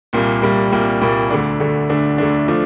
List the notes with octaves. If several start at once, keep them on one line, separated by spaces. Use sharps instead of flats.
C2 A#2 G3 A#3
C2 A#2 G3 A#3
C2 A#2 G3 A#3
C2 A#2 G3 A#3
D2 D3 A3 D4
D2 D3 A3 D4
D2 D3 A3 D4
D2 D3 A3 D4
F3 A3 D4 F4